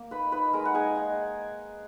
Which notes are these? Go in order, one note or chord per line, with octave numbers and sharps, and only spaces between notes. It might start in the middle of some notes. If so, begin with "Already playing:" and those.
Already playing: A#3
D#4 B4 B5
D#4 B4 B5
G#3 A#4 A#5
F#5
D#4 G#4 G#5
D#4